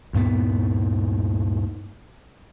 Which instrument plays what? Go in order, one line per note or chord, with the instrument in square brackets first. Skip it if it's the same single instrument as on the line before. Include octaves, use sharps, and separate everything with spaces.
[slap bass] D2 G2 A#2 B3